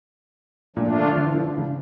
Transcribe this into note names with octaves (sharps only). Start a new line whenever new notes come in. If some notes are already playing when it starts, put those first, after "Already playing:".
A#2 F3 A3 D4 F4
D3
D3
E3
F3
D3
C#3